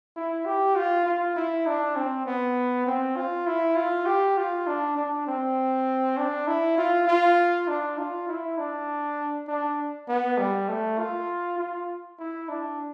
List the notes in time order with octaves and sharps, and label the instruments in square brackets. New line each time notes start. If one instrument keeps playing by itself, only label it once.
[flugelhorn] E4
G4
F4
F4
E4
D4
C4
B3
C4
F4
E4
F4
G4
F4
D4
D4
C4
D4
E4
F4
F4
D4
F4
E4
D4
D4
B3
G3
A3
F4
F4
E4
D4